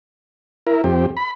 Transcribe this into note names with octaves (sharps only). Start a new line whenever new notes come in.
E4 A#4
F2 C4 G4
B5